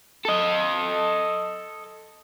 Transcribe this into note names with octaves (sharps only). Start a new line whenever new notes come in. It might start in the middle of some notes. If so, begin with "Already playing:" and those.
A4 D#5